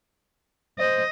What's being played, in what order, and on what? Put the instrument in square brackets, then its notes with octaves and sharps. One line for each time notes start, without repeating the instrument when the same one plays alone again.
[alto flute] C5 [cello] D#5